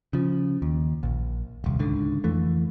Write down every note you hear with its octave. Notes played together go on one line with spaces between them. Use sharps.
C#3 F3
D#2
A#1
D#1 C2
C#2 G#2 D3
F2 E3 A3